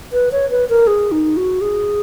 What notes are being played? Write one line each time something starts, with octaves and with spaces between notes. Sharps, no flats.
B4
C#5
B4
A#4
G#4
D#4
F#4
G#4